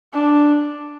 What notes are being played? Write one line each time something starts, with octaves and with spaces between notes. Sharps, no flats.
D4